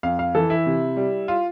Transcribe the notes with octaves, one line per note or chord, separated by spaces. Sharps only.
F2 F5
F5
E3 A4
E4
C3
G3
F4